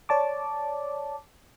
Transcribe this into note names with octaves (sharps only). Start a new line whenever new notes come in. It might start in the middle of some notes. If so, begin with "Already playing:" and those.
C#5 D5 A5 D6